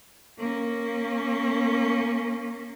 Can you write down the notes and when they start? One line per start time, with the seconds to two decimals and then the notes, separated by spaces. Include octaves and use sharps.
0.38 A#3 C#4